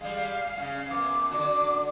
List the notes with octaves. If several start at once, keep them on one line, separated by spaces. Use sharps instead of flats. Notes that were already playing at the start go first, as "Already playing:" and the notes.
G3 G#3 F5
C#3 C#4 F5
F#2 B3 D6
D3 D4 F#4 D6